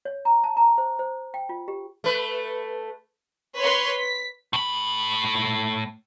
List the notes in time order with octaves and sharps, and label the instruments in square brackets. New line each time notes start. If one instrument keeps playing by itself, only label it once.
[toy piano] C#5
A#5
A5
A#5
C5
C5
G5
F4
G4
[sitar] A3 B4
[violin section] B4 C#5 C6 C#6
B6
[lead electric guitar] A2 B5